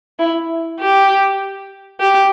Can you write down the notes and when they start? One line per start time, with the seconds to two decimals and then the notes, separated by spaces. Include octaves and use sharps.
0.19 E4
0.80 G4
2.00 G4